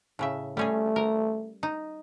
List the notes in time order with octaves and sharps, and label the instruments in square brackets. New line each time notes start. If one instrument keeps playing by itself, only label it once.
[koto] A2 C#3 E5
[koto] G3 C#4 G#4 [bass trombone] A3
[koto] A#4
D#4